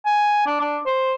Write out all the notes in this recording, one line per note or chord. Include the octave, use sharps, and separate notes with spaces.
G#5
D4
D4
C5